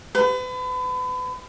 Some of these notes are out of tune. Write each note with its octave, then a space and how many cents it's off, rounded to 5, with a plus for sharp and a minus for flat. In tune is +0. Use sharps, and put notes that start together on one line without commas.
B4 +35